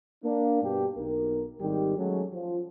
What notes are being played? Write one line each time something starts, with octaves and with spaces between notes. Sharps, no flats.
A#3 D4
G2 B2 D4 G4
B1 A#4
G#1 D#3 G3 G4
F#3 G#3 A3 C#4
F3